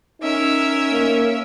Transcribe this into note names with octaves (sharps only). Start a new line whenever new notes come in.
C#4 D#4 A#4 E5
A#3